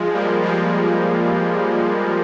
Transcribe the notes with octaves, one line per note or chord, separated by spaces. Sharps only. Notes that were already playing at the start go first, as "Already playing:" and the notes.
Already playing: F3 G#3
G3 A#3
F3 G#3